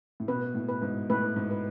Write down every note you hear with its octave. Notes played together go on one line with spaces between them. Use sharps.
A2
B2 B4
A2
B4
G#2
A2 B4
G#2
B4